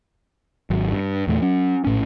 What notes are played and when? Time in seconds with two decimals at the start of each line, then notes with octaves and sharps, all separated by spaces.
0.70 G#1 F#3
0.92 G2
1.27 E2 A#2 A3
1.42 F#3 C#4
1.85 A#1 A2 C#4